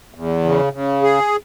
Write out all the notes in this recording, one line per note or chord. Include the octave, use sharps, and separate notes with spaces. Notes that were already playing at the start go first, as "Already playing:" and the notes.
E2
C#3
C#3
G#4